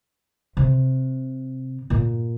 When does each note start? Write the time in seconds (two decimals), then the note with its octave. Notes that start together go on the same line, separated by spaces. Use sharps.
0.57 C3
1.90 A#2